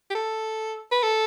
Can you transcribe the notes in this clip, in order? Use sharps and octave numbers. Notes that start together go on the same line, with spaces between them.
G4
A4
B4
A4